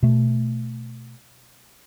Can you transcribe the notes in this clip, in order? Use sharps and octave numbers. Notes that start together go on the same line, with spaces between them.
B2 A3